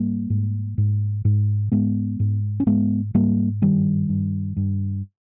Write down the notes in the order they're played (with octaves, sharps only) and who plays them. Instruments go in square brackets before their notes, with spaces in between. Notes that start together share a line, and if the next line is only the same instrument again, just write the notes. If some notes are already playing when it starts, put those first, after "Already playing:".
Already playing: [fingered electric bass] G#2 G3 A#3
G#2
G#2
G#2
G#2 G#3 B3
G#2
C#4
G#2 G#3 B3
G#2 G3 A#3
G2 D#3 G3
G2
G2